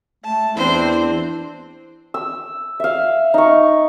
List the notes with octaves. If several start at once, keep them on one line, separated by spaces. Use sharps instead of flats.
A3 A5
E2 C4 D4 E4 C5
E6
E5 F5
D#4 C#6